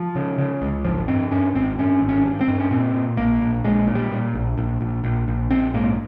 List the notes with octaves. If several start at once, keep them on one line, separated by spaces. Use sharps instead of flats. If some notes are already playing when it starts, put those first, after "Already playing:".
Already playing: F3
C#3
C#3
C#2
G#1 F3
G2 C4
G2 C#4
G#1 C4
G2 C#4
G#1
C#4
G2
C4
G2
C#4
A#2 C4
A#2
A#1 A#3
A#1
A#1 G#3
A#2
G3
A#2
A#1
A#1
A#1
A#1
A#1
A#1 C4
G#2 A#3